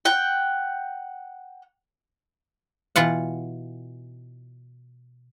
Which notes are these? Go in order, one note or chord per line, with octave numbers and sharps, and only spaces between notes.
F#5 G5
B2 E3 F4 F#5